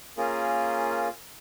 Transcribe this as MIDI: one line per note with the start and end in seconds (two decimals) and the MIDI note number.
0.18 1.08 58
0.18 1.08 61
0.18 1.08 65
0.18 1.08 68
0.18 1.08 70